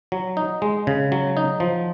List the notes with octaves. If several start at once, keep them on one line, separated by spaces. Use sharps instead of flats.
F#3
D#4
G#3
C#3
F#3
D#4
F3